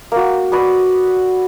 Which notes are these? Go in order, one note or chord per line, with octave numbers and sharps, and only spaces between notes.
A#3 F#4
F#4 B4 D5 D#6